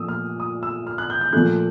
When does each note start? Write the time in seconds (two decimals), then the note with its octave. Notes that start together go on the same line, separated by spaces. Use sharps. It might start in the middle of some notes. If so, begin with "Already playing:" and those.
Already playing: A#2 F3 A3 D#6 E6
0.08 F6
0.40 D#6
0.63 E6
0.87 F6
0.98 F#6
1.10 G6
1.21 G6
1.33 A#2 F3 A3 F#6